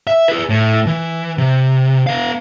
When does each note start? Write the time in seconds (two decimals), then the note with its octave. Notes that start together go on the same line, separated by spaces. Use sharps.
0.07 E5
0.28 G#4 B4
0.49 A2
0.86 E3
1.38 C3
2.07 B3 F5